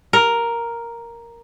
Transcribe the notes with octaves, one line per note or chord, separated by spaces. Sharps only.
A#4